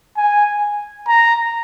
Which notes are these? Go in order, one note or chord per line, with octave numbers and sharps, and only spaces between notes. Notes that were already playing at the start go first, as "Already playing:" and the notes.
G#5
A#5